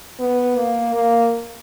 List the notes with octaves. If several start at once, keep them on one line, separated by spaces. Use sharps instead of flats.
B3
A#3
A#3